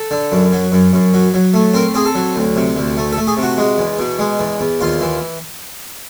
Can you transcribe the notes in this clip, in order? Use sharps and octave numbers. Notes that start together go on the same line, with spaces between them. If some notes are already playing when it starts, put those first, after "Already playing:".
Already playing: A4
D3
F#2
F#3
F#2
F#2
F#3
F#3
A3
C4 A#4
C4 G#4
A4
F#3
D2
C3
D2
A3
A4
A3
G#4
C3
F#4
G#3
E2
B2
G#3
E2
E2
D#2 F4
E3